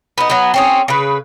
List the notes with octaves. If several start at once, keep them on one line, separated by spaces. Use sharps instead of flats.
B3 D#4
F#3 B3
C4 C#4 G#4
C#3 B4